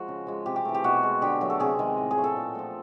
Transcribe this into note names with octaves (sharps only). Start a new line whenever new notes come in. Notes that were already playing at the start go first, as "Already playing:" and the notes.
Already playing: F3 G#3 F#4
C#3
F3 G#3
C3 G4
G4
E3 A3
G4
B2 F#4
G#3
D3 G4
F#3 A3
A4
C3 G#4
D#3 G#3
A2
G#4
F#3 A3
A4
A#2
F3 A3